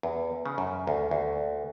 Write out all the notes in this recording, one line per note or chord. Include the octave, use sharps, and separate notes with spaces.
E2
C#3
F#2
D2
D2